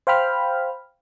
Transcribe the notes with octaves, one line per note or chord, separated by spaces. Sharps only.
C5 F5 G5 B5 F6